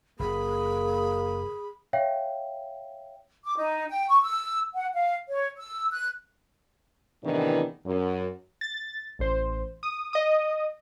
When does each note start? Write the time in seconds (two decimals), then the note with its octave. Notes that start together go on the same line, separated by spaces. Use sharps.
0.20 F#1 A#3 G#4 B5
1.93 C#5 E5 F5 G5
3.45 D6
3.57 D#4
3.90 G5
4.09 C#6
4.22 E6
4.74 F#5
4.94 F5
5.28 C#5
5.57 E6
5.92 F#6
7.24 A2 C3 D#3 E3 B3 D4
7.86 F#2
8.61 A6
9.19 A1 C5
9.83 D#6
10.13 D#5 D#6